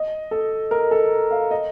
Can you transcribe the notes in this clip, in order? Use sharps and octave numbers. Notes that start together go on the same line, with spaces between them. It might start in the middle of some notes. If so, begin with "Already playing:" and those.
Already playing: D#5
A4
A#4
A4
F5
D#5